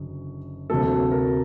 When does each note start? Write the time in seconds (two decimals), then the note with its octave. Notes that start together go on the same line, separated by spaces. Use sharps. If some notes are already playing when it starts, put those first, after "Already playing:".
Already playing: F#1 F#2 D3
0.70 D2 C3 F#3 A#3 A4
1.12 A#4